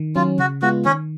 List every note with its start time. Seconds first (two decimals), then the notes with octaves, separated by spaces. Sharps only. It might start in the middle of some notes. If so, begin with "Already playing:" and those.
Already playing: D#3
0.16 F#3 C#4 F4
0.39 C#3 F#4
0.62 G#3 B3 F4 F#4
0.85 D#3 C#4